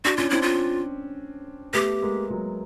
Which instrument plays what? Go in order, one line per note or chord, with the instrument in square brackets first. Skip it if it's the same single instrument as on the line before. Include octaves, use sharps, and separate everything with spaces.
[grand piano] D4 [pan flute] F#4
[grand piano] C#4 [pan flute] F4
[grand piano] C4 D4 [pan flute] E4
[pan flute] F4
[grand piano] A3 B3 [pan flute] G4
[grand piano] G#3 A#3
F#3 G#3